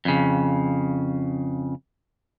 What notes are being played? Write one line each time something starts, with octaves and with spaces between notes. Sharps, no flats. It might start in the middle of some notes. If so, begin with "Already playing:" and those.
F2 C#3